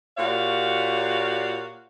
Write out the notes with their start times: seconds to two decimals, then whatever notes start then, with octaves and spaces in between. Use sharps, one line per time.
0.18 A#2 F#4 G4 C#5 D5 F5